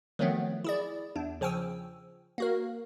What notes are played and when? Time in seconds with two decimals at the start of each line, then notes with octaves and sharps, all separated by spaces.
0.19 D#3 F3 F#3 A3 B3 C4
0.64 E4 G#4 D5
1.16 E2 D4
1.41 C#3 F3 G5 G#5 E6
2.38 A#3 F#4 A#4